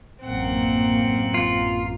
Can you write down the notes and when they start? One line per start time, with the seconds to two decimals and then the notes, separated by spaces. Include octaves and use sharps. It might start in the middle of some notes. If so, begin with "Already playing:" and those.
0.22 A1 F#2 A#3 C4 F#5
1.34 F4